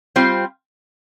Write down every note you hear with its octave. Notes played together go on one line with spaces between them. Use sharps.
G3 C4 F4 C5